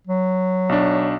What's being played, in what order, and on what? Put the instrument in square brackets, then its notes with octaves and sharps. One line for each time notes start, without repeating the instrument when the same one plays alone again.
[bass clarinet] F#3
[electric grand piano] B1 D4